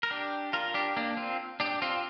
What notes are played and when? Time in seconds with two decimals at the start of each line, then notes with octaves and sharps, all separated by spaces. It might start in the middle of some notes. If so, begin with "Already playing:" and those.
0.03 A#4
0.10 D4 G4
0.53 F4 A#4
0.74 D4 G4
0.97 A#3 D4
1.17 C4 F4
1.60 D4 G4
1.82 C4 F4